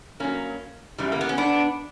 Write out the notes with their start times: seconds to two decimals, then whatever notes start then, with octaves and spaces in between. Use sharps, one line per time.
0.20 G2 F#3 A#3 C#4
0.98 F#2 C#3 E3 G3
1.12 A#3
1.21 B3
1.29 C#4
1.38 B3 D4